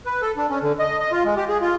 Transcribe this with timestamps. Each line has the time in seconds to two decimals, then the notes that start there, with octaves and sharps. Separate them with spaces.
0.06 B4
0.22 A4
0.37 D4
0.50 C#4
0.62 D3
0.79 D#5
1.00 D#5
1.12 F4
1.25 G#3
1.37 G4
1.49 G#4
1.61 F4